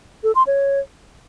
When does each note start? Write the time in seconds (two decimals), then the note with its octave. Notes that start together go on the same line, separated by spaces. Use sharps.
0.24 A4
0.35 C6
0.47 C#5